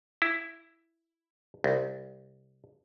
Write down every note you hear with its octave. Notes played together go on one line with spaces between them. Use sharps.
E4
C2